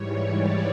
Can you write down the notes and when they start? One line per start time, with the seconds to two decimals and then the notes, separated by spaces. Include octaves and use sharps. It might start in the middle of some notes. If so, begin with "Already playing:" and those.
Already playing: G#2 E3 G3 C#5
0.35 D5